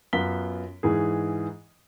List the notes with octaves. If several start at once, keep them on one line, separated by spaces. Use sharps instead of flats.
F#2 B3 F4 B6 G7
G#2 E3 G#4